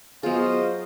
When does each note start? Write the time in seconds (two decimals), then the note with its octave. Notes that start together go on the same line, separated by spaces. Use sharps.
0.23 F#3 B3 F4 G#4 C5 D#5 F5